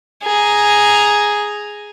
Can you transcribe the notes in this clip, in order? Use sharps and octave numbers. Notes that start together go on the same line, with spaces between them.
G#4 A#5